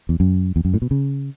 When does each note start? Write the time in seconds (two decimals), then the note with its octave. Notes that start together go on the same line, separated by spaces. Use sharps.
0.09 E2
0.20 F#2
0.56 E2
0.65 F#2
0.74 A2
0.82 B2
0.91 C#3